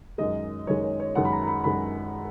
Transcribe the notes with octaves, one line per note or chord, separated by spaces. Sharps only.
F#2 D#3 G#3 D#5
F#2 D#3 G#3 C#5
C#5
C#5
F#2 D#3 G#3 F#5
B5
A#5
A#5
B5
F#2 D#3 G#3 B5